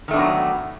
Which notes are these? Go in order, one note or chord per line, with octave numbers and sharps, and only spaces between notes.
D#3 F#3 A3 B3 D4